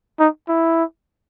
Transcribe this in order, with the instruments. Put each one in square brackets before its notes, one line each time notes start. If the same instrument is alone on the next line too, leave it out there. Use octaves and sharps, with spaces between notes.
[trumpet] D#4
E4